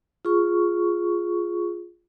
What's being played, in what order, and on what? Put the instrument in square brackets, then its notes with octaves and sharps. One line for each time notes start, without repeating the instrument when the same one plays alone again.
[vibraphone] F4 G#4 C#6